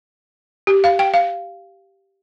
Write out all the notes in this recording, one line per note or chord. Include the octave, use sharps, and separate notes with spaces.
G4
F5
G5
F5